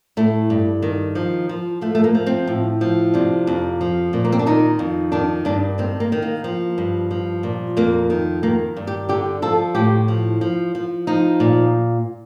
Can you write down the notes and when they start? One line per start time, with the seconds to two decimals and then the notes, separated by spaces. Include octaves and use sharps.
0.17 A2 A3
0.50 G2
0.82 D#3
1.15 F3
1.49 F3
1.81 F3 A3
1.95 A3
2.04 A#3
2.15 F3
2.26 C4
2.47 A2
2.81 F3
3.14 C3 D4
3.47 F2
3.81 F3
4.13 A#2
4.25 A#3
4.32 C4
4.39 D4
4.46 D#3 D#4
4.79 F2
5.12 D#3 D4
5.45 G2 D4
5.78 D#3 C4
6.00 A#3
6.12 D#3
6.22 A#3
6.44 F3
6.78 G2
7.11 F3
7.43 A#2
7.77 F2 A#3
8.10 D#3
8.43 D#3 A#3
8.76 G2
8.87 G4
9.09 D3 G4
9.42 F3 A4
9.75 A2 G4
10.08 F3
10.41 F3
10.75 F3
11.07 F3 D#4
11.40 A#2